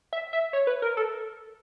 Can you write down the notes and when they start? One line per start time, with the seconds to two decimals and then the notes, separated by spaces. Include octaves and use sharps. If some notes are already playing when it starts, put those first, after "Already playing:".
0.13 E5
0.33 E5
0.53 C#5
0.67 B4
0.82 A#4
0.97 A4